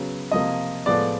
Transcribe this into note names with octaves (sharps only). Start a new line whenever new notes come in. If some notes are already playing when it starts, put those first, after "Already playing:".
Already playing: C#3 F#3 B3
C3 F3 A#3 D#5
A2 F3 G#3 B3 D5